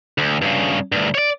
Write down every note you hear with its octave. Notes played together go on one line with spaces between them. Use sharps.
D2
G2 C#3
D2 G2
C#5 D5